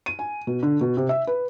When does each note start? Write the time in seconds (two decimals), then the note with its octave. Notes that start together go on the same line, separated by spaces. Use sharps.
0.06 D#7
0.19 G#5
0.47 B2
0.63 D3
0.81 B2
0.97 C3
1.09 E5
1.27 B4